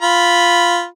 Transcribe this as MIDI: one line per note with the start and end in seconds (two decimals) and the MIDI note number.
0.02 0.85 65
0.02 0.85 83